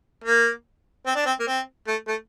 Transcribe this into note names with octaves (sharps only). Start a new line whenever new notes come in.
A#3
C4
D4
C4
A#3
C4
A3
A3